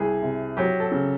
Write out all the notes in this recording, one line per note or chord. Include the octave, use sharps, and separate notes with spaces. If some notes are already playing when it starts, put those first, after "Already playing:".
Already playing: C2 G#4
C3
F#3 G4
A4
C#3